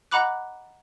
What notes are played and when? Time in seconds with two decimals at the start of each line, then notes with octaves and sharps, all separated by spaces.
0.11 D#5 F#5 A#5 B5 D6 F#6